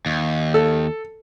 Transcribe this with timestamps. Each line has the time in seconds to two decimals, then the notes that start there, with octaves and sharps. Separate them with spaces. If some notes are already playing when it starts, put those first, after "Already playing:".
0.06 D#2
0.54 A4